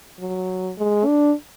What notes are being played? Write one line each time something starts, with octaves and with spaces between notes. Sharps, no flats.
F#3
G#3
D4